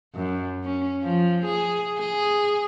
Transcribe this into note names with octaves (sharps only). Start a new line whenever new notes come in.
F#2
C#4
F3
G#4
G#4